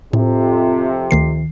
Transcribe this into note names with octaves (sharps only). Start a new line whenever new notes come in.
F2 A2 C3
D2 D#3 C7